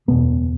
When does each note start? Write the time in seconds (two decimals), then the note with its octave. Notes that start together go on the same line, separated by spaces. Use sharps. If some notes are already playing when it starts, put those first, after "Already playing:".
0.08 F#1 E2 B2 B3